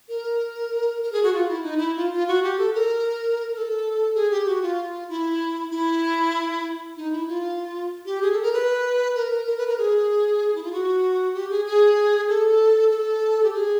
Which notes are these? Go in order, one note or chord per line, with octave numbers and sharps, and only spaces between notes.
A#4
A#4
G#4
F#4
F4
E4
D#4
E4
F4
F4
F#4
G4
A4
A#4
A#4
A4
G#4
G4
F#4
F4
E4
E4
D#4
E4
F4
G4
G#4
A4
A#4
B4
A#4
A#4
A#4
B4
A#4
G#4
E4
F4
F#4
G4
G#4
G#4
A4
A4
G4
G#4